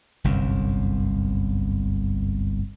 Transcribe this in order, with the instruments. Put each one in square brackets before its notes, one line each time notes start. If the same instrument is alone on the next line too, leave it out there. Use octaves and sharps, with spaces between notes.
[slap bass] G1 C2 F#2